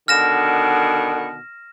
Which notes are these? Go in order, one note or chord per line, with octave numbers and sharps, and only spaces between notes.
B2 D3 D#3 F6 A#6 E7